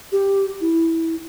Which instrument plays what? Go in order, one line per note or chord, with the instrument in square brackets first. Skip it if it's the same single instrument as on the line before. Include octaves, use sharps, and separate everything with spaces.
[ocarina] G4
E4